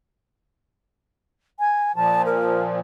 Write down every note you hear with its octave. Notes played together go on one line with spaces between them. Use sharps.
G#5
A#2 F3 A5
A#4